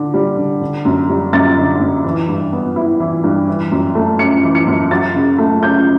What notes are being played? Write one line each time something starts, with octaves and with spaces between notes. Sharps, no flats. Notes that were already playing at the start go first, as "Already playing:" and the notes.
Already playing: D3
G3
D3
D3
F#2
G3
F#2 A6
D3
F#2
E3
G2
B3
E4
E3
G2
E3
F#2
A3
C#4 C#7
E3
C#7
F#2
F#3 A6
C#3
A3
C#4 G6